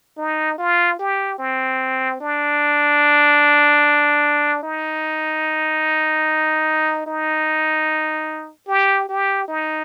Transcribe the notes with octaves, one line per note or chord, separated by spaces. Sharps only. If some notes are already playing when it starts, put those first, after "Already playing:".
D#4
F4
G4
C4
D4
D#4
D#4
G4
G4
D#4